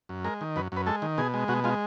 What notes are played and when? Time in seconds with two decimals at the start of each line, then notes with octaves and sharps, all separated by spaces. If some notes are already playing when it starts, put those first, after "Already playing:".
0.09 F#2
0.25 G#3 A#4
0.41 D#3
0.56 F#2 B4
0.72 F#2 B4
0.86 G#3 A4
1.02 D#3
1.18 B2 G#4
1.34 G#3
1.48 B2 F#4
1.64 G#3 F4